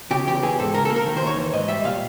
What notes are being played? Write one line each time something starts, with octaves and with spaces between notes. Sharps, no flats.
C#3 G4
E2 G4
E3 G#4
G#2 A4
C#3 A#4
A#3 A4
A#4
D#3
C5
D#2
C#5
E3
G#2 D#5
G3 E5
A#2 F5